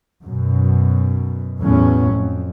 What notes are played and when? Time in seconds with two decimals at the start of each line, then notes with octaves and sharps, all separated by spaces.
0.24 F#2 B2
1.62 E2 A2 F#3 C#4
2.12 F2